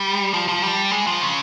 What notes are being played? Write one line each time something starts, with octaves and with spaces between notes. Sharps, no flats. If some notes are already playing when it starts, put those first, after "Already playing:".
Already playing: G3
F3
F3
G3
G#3
F3
C#3